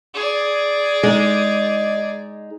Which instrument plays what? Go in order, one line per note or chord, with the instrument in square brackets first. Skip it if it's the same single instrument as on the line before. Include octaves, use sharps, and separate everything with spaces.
[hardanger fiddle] G#4 D5
[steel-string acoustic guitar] G#3 D#4